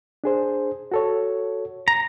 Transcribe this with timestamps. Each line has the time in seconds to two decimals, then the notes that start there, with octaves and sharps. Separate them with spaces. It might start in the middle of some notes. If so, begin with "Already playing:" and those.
0.24 D4 G#4 C5
0.92 F#4 A4 C#5
1.88 A#5